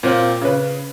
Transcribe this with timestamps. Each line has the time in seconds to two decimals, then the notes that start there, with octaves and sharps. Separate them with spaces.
0.03 A#2 C4 F4
0.42 C#3 B4